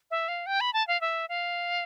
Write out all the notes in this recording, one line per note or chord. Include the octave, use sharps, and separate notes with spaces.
E5
F5
G5
B5
A5
F5
E5
F5